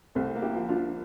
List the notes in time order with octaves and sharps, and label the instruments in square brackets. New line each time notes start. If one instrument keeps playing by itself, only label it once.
[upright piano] C2 [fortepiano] A3 C4
[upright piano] A#3
[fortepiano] E4 G4
[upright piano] F3
[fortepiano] D4 F4
[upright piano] F3